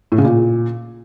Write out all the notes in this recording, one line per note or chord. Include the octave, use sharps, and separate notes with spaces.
A2
C#3
A#2